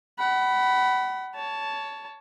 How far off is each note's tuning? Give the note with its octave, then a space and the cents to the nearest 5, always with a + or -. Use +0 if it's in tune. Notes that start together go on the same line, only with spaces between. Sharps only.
F#5 +35 B5 +0
C#5 +20 A5 +0